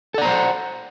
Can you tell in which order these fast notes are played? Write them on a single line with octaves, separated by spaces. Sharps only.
A4 D5 A#5 C5 F#5